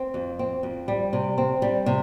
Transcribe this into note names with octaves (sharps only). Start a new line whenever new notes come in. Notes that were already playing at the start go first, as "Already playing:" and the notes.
Already playing: C4
F2
C4
F2
G3
C3
C4
G3
C3